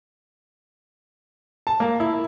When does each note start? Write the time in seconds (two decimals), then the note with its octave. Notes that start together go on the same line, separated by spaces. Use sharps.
1.67 A5
1.80 A#3
2.00 E4